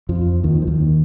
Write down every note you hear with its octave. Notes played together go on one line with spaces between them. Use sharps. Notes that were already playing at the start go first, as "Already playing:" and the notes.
F2 F3
D#2 D#3
F3
D#2 D#3